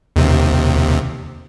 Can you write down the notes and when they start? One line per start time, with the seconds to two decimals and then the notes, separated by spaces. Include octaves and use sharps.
0.16 D#2 C3